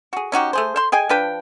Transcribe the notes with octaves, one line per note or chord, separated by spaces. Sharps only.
F#4 G#4
C#4 D#4 F#4 G4
A3 G#4 C5
C5 C6
G#4 D#5 G5 G#5
F3 D4 B4 G5